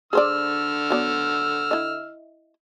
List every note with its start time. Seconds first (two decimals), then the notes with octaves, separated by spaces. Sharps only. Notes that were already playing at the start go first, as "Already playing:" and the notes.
0.13 D3 G#4 C5 D5 E6 F6
0.90 F#3 B3 D5
1.71 E4 D#5